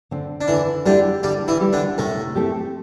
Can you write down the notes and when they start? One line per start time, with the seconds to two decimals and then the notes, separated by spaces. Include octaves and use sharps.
0.11 D3 C4
0.41 D4
0.48 D3 E3 E4
0.85 D3 G3 D4 E4 G4
1.23 D3 G3 G4
1.48 E3 E4
1.61 G3 E4 G4
1.73 D3 D4
1.98 A2 C3 A3
2.35 A3 C4 E4 G4